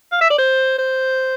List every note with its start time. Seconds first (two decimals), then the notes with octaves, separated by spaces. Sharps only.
0.12 F5
0.21 E5
0.30 D5
0.39 C5
0.79 C5